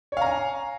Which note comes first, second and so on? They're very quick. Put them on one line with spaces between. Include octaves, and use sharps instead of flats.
C#5 F5 A#5 G#5